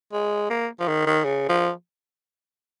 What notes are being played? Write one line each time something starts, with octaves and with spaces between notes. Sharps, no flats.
G#3
A#3
F3
D#3
D#3
C#3
F3